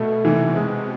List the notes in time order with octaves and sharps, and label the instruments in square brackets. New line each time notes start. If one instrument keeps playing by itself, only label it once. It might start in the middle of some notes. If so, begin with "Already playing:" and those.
Already playing: [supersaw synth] B2 [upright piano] A3
[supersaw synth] C3 [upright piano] E3
[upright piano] G#3